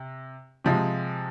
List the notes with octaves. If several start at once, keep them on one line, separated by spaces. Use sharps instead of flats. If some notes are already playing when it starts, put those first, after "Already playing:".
Already playing: C3
C3 F3 G#3